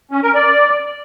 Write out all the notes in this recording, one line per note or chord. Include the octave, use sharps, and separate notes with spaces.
C#4
A#4
D5